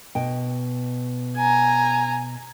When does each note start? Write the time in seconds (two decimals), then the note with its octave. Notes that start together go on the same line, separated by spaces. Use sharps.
0.15 B2 G5
1.37 G#5 A#5